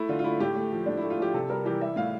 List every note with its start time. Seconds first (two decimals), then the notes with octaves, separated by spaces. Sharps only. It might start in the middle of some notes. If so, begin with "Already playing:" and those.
Already playing: A3 E4
0.09 D3 F4
0.19 F4
0.24 A3 E4
0.40 A2 G4
0.56 A3
0.72 F3
0.86 A2 D4
0.97 E4
1.03 A3
1.10 F4
1.19 F3 G4
1.34 C3 A4
1.50 G3 A#4
1.65 E3 G4
1.81 G3 E5
1.96 A2 F5